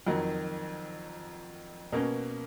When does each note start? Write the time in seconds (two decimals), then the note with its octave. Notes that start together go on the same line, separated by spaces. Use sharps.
0.07 F2 D#3 F#3
1.92 B2 A#3 C#4